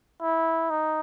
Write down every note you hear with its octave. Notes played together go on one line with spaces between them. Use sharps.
E4
D#4